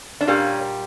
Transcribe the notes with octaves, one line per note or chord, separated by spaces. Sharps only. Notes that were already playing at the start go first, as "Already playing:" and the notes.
D4
A#2 G3 A#3 C#4